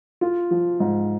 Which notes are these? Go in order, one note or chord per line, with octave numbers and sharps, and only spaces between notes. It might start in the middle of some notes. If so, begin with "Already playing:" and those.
F4
F3
G#2